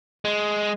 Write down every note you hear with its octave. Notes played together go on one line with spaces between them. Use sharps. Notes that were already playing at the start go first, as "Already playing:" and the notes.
G#3